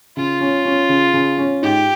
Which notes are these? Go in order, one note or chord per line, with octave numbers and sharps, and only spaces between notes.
C#3 F4
C#4
C#4
C#3
C#3
C#4
G#2 G4